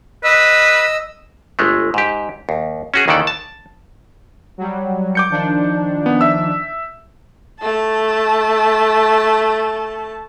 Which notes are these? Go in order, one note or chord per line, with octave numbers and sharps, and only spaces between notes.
B4 D#5 E6
G1 G#3 A3
G#2 G4
D#2
C#4 F#4 G#4
D#2 D#3 E3 A4 D5
A5
F#3 G3
D6 G6 C#7
D#3 F3 D4
B3
E5 E6
A3 A5